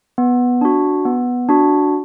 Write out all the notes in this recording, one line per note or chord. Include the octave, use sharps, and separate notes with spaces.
B3
D4 F#4
B3
D4 F#4